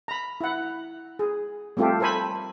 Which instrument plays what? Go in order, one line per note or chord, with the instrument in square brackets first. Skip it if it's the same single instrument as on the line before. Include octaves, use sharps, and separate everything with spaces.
[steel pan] A#5 B5
E4 F#5
G#4
G3 A3 C4 F4 G4 A4
A4 A#4 C5 G#5 B5